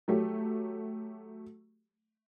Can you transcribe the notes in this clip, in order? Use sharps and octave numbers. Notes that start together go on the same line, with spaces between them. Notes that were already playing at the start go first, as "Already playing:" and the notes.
F#3 A3 G4